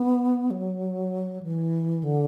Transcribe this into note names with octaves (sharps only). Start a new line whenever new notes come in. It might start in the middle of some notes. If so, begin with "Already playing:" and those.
Already playing: B3
F#3
E3
D3